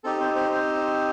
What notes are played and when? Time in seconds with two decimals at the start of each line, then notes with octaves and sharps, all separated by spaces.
0.04 C4 D#4 G4 A4
0.20 C4 C5
0.36 C4 C5
0.51 C4 C5